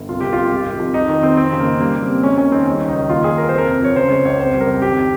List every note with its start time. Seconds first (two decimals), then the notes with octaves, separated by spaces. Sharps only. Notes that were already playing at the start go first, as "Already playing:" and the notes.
Already playing: G1
0.09 C2 F4
0.21 C2 G4
0.33 C2 F4
0.51 G#3 G4
0.66 G#1
0.80 F3
0.94 F2 D#4
1.09 D#3
1.23 D#3 C4
1.37 F2 C4
1.52 C#3
1.60 A#3
1.66 C#3
1.80 G3 A#3
1.95 G3
2.03 C4
2.09 F2
2.23 G#3 C#4
2.38 D#2 C#4
2.52 D#3 C4
2.66 G3 C#4
2.81 C#2
2.88 D#4
2.95 D#3
3.09 D#2 F4
3.24 D#2 G#4
3.38 D#2 A#4
3.49 F2 C5
3.58 A#4
3.67 C3
3.81 F3 C#5
3.96 C#3 C5
4.10 G#3 C#5
4.25 C#2 C#5
4.39 F2 C5
4.54 G3
4.61 A#4
4.67 F2
4.82 G#1 G4